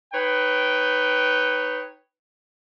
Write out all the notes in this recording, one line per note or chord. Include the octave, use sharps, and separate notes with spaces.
D#4 B4 C#5 G5